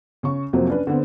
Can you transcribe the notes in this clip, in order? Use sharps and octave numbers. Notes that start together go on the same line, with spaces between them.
C#3 C#6
F2 C3 F3 F#3 A#3 C4
C#4 D4 B4
D3 B3 C4